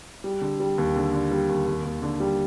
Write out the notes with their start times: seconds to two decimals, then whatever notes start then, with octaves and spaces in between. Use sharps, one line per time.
0.24 G3
0.41 D3
0.60 G3
0.78 D#2
0.96 D3
1.13 D3
1.31 G3
1.49 D#2
1.66 D#2
1.85 D#2
2.02 D3
2.20 G3